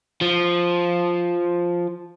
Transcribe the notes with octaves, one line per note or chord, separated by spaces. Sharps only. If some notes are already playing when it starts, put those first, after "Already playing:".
F3